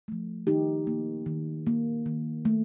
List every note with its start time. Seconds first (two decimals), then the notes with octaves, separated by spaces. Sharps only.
0.08 F3 A3
0.47 D#3 D#4 G4
0.87 A#3
1.26 D#3
1.67 A#3
2.06 D#3
2.45 A3